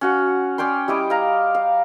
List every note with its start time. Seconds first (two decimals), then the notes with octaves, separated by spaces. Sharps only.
0.01 C#4 F#4 F#5
0.58 C#4 D5 G5 C6
0.88 G3 E4 D#5 D6
1.10 F5 A#5
1.55 F5